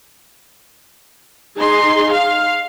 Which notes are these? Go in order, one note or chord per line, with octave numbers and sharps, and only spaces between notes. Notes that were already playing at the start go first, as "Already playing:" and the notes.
D#4 G#4 C6
F5